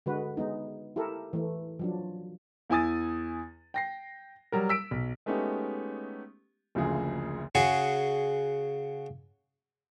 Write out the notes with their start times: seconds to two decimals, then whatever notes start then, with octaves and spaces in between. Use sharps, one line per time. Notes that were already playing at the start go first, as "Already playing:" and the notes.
0.06 D3 G#3 F#4 B4
0.37 G#3 B3 D#4
0.96 E4 G4 A4 A#4
1.33 E3 A3
1.79 F3 F#3 D4
2.70 E2 E4 G#5 D#6 A6
3.74 G5 A#6 C7
4.52 F#3 G3 A#4
4.69 E6 B6 D7
4.91 B1
5.26 G#3 A3 B3 C#4 D#4 G4
6.75 F#1 D2 C#3 F3 G#4
7.55 C#3 F#4 G#4 F#5 C#6